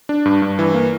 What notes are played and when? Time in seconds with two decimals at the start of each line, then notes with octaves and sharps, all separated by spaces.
0.09 D4
0.25 G2
0.42 G2
0.59 E3
0.74 A#3